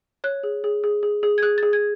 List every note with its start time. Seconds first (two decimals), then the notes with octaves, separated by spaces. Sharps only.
0.24 C#5 F#6
0.43 G#4
0.64 G#4
0.84 G#4
1.03 G#4
1.23 G#4
1.38 G#6
1.42 G#4 F#6
1.58 A6
1.63 G#4
1.73 G#6